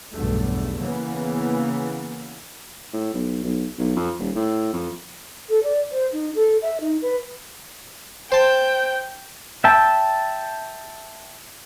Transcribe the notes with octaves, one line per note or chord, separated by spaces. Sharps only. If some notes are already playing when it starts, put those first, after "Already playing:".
B1 E2 G2 A3
C#3 E3 A#3 B3
A2
B1
B1
B1
F2
D#1
A2
F2
A4
D5
C5
D#4
A4
E5
D#4
B4
C5 G5 A5
E5 G5 A5